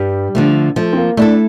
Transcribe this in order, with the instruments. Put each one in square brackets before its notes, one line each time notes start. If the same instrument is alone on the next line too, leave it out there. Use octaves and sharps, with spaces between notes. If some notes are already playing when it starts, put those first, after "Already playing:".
Already playing: [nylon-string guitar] G2 [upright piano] G3
[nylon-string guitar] D3 F3 A3
[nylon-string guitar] F3 [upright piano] A3
[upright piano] C4
A#3
[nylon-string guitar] A3 E4 A4 [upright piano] D4